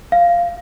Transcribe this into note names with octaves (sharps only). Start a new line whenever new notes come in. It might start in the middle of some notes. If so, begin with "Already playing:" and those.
F5